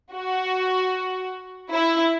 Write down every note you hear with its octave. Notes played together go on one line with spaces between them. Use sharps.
F#4
E4